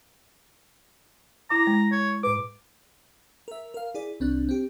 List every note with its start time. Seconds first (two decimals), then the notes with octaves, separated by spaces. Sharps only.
1.50 E4 A#5 D6
1.67 G#3
1.92 C#5
2.23 A2 B4 D6
3.48 A#4 E5
3.74 A#4 F5
3.94 E4 G#4 D5
4.20 C2 C4 D4 F#6
4.49 C4 G4